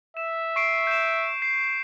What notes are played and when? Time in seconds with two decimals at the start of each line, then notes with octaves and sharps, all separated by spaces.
0.17 E5 E7
0.56 C#6 C7 D7
0.87 G6 E7
1.42 C7